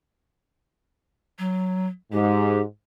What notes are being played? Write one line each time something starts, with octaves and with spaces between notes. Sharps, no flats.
F#3
G#2 G4